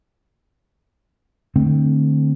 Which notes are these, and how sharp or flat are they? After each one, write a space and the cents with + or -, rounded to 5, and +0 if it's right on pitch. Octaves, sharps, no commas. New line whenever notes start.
D3 +20 A3 +0 C4 +5